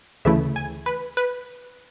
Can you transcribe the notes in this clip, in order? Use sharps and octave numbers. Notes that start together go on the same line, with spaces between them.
D2 C#3 E3 A3 E4 E5
G#5
B4
B4